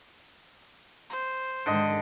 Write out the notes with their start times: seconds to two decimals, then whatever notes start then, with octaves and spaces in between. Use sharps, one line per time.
1.10 C5
1.66 G#2 D3 D#3 G#3 D#5